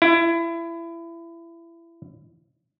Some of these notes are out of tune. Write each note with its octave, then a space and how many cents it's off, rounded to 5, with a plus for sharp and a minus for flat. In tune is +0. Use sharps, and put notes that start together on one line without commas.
E4 +25